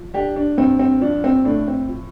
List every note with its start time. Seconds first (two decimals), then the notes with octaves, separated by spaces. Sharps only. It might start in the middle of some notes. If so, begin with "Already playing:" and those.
Already playing: F3
0.14 D3 D4 G4
0.36 D4
0.57 G2 C4
0.79 C4
1.01 F3 D4
1.24 C4
1.45 A2 D4
1.68 C4
1.89 F3